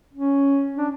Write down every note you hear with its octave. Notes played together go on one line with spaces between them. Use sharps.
C#4
D4